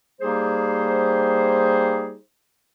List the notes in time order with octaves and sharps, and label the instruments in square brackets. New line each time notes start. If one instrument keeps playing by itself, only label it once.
[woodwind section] G3 A#3 D#4 G4 G#4 C5